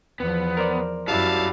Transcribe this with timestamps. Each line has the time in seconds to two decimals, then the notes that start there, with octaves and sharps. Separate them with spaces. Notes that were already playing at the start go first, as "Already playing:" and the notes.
0.20 E2 F3 B3
0.57 A#4 C5 D5
1.08 F#2 F#3 G3 E4 F5 A5